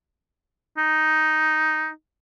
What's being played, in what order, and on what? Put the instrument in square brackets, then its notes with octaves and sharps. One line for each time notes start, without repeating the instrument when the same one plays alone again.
[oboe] D#4